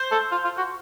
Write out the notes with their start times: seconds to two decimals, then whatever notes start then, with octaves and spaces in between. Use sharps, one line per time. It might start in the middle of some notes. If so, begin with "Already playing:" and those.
Already playing: C5
0.12 A4
0.32 F4
0.44 F4
0.58 F#4